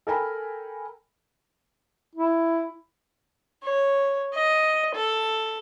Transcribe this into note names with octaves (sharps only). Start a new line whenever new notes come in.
A4 A#4 G5 G#5 A#5 B5
E4
C#5
D#5
A4